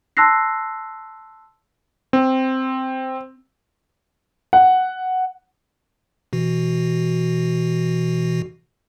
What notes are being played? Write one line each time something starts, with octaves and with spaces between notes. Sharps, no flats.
A5 C6 E6 F#6 A#6 C7
C4
F#5
B2 E3 F#4